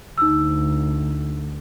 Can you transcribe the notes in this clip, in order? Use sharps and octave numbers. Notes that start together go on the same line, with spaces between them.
D2 D#4 E6